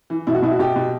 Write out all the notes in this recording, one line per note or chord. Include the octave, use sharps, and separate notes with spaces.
E3
B2 E4
F#4
B2 E4
F#4
B2 G4
B2